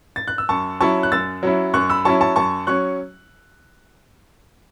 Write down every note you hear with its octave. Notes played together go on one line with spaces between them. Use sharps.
A6
F#6
E6
F#2 A5 C#6
F#3 C#4 E4 A5 C#6
F#6
F#2 E6 A6
F#3 C#4 E4
F#2 C#6 F#6
B5 E6
F#3 C#4 E4 A5 C#6
A5 C#6
F#2 A5 C#6
F#3 C#4 C#6 F#6